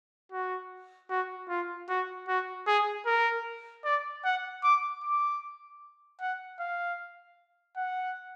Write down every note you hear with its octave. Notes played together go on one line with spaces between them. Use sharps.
F#4
F#4
F4
F#4
F#4
G#4
A#4
D5
F#5
D6
D6
F#5
F5
F#5